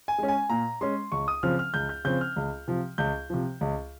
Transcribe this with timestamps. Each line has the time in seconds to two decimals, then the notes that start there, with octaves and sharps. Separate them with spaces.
0.08 G#5
0.18 G#3 C#4
0.28 G#5
0.50 A#2 A#5
0.81 G#3 C#4 C6
1.12 C#2 C#6
1.28 D#6
1.43 C#3 F3 C4 F6
1.59 F6
1.74 C#2 G6
1.89 G6
2.05 C#3 F3 C4 G6
2.21 F6
2.36 C#2
2.67 C3 F3
2.98 C#2 G6
3.30 C3 F3
3.61 C#2